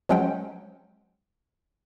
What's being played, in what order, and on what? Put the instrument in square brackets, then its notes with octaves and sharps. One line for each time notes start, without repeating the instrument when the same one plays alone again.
[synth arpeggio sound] F3 F#3 G#3 C#4 F#5 G5